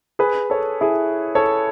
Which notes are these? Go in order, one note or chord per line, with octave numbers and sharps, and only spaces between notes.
G#4 B4
A4 C#5
E4 G#4
A4 C#5